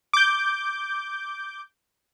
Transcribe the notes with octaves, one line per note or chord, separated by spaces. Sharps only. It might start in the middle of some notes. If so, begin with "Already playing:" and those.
D6 G6